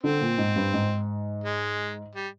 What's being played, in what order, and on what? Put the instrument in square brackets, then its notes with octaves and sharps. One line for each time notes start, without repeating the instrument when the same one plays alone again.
[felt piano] D3 [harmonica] C4
[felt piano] A#2
G#2
G2
G#2
[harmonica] G#3
G3